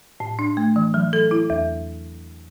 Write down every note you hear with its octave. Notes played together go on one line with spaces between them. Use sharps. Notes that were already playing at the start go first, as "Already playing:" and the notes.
A2
D4
A3
E3
F#3
A4
E4
E2